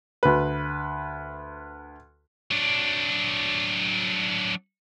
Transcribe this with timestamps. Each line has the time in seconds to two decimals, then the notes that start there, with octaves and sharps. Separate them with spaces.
0.23 D2 B4
2.51 F#3 D4